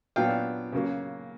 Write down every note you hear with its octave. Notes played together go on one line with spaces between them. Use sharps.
A#2 F#3 B3 D4 F5 G5
C#3 F#3 A#3